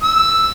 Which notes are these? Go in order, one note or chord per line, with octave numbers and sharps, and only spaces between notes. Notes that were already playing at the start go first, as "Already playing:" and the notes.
E6